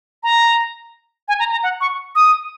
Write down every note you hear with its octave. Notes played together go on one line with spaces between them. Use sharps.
A#5
G#5
A#5
A#5
F#5
C#6
D#6